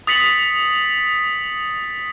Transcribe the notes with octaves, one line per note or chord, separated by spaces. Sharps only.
D#6 A6 B6 C#7 F#7